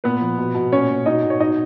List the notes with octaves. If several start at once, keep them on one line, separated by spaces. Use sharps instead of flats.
A#2 B3 B4
F3
B2
B2
A#2 C#4 C#5
A#2
B2 D#4 D#5
B2
C#5
B2 D#4 D#5